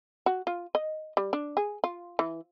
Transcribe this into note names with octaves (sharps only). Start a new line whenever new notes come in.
F#4
F4
D#5
G3
D4
G#4
F4
E3